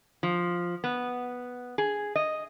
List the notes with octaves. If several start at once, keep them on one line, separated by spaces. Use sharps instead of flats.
F3
B3
G#4
D#5